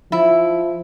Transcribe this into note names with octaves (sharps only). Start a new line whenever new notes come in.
F3 E4